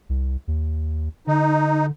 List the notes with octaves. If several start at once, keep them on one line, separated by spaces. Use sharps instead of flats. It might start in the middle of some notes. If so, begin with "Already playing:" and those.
C2
D#2
D3 D#4